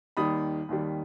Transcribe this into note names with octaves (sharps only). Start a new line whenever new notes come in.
D#2 D#3 G3 B5 D#6
D#2 D#3 G3